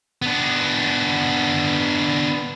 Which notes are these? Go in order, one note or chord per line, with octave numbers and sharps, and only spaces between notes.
B3 D4